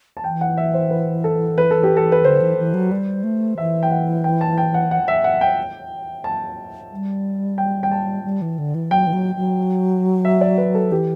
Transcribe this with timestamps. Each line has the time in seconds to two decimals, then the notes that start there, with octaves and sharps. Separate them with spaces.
0.17 A5
0.24 E3 G5
0.41 F#5
0.57 E5
0.74 C5
0.91 B4
1.24 A4
1.58 B4
1.71 A4
1.83 G4
1.97 A4
2.12 B4
2.25 D3 C5
2.41 E3
2.58 E3
2.74 F#3
2.92 G3
3.24 A3
3.58 E3 E5
3.83 G5
3.91 F#5
4.24 G5
4.41 A5
4.58 G5
4.74 F#5
4.91 F#5
5.08 E5
5.24 F#5
5.41 G5
6.24 A5
6.91 G3
7.58 G5
7.83 G5
7.91 A5
8.24 G3
8.42 E3
8.58 D3
8.75 E3
8.91 F#3 G5
9.07 E3
9.13 F#3
9.36 F#3
10.25 E5
10.41 D5
10.58 B4
10.75 A4
10.91 E3 G4